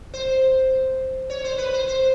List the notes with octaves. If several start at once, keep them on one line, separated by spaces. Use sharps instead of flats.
C5
C#5
C5
B4
C5
C5